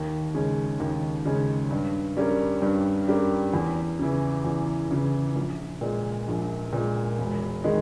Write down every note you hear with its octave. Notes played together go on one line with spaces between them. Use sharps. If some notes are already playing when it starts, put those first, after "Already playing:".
Already playing: D#2
C#3 G#3 C#4
D#2
C#3 G#3 C#4
G2
G3 C#4 G4 A#4
G2
G3 C#4 G4 A#4
E2
C#3 E3
E2
C#3 E3
A#1
A#2 G#3
A#1
A#2 G#3
E1
D#3 G#3 D#4